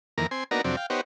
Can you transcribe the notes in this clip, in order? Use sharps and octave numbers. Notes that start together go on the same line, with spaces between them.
F2 D#3 E3 A#3 A#5
C4 G#5 C6
A#3 B3 D4 D#4 F#4 A#5
F2 C3 F#3 C4 D4
F5 G5
B3 D#4 G4 C5 C#5 F#5